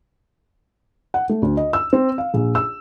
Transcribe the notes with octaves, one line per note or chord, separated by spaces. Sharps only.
F#5
A3
D2
D#5
E6
C4
F5
A#1
E6